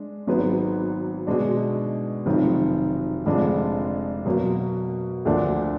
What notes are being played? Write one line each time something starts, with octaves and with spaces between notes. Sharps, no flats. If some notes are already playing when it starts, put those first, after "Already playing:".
Already playing: G#3 D4
G#1 G#2 F#3 B3
B2 G#3 D4
F1 F2 D#3 F#3
F1 F2 D3 G#3 D4
B2 F#3 A#3
D2 D3 F3 A#3 D4